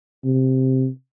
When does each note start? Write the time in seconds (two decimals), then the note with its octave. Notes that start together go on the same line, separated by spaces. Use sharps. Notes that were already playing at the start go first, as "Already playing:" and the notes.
0.24 C3